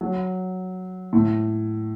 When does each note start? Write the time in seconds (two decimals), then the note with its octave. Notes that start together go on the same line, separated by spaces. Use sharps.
0.01 F#3
1.13 A2